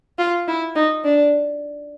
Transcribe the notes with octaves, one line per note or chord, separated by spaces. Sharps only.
F4
E4
D#4
D4